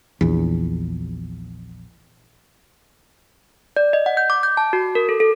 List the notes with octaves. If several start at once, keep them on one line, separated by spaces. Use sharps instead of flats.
A#1 E2
D5
D#5
F#5
G6
D6
G6
A5
F#4
A#4
A4
A4